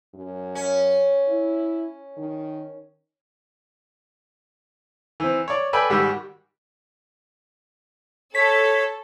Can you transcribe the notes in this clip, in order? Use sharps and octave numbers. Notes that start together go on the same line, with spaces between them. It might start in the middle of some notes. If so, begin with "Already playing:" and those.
F#2
C#4
E4
D#3
E3 C4
C#5 D5
A4 B4 D5 G5 G#5 B5
G#2 D#3 G3 F#4 G4 E6
A4 C#5 B6